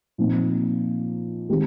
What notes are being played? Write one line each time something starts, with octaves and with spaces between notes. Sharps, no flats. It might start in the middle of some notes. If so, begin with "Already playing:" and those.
A#2 F3 C4 D#4
D#3 G#3 C4 G4